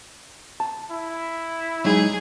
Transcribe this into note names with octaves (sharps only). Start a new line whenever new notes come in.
A5
E4
F#3 G#3 D#4 G#4